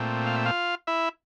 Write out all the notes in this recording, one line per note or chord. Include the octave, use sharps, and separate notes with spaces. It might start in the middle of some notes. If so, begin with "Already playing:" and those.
Already playing: A#2 A3 C4
F5
E5
F4 F5
E4 E5